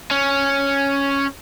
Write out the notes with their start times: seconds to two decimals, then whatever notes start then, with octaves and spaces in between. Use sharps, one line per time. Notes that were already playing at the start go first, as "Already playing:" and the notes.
0.11 C#4